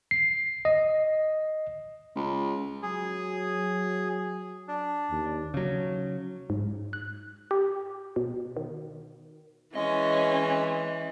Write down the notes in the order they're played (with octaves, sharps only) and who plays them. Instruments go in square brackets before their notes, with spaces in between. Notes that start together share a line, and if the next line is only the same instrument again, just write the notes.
[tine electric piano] C7
D#5
[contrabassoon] C#2
[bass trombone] F#3 [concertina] G#4
[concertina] D4
[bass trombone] D#2
[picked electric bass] C#3 F#3
[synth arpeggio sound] G#2
F#6
G4
B2
D#3
[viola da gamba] E3 [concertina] G#3 [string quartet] C#4 [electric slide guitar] D#5